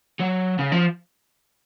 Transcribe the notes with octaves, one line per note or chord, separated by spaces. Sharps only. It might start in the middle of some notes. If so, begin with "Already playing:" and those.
F#3
C#3
F3